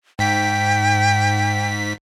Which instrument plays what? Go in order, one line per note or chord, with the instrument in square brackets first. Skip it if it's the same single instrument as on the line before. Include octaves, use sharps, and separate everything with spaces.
[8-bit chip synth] G#2 B6 [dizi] G5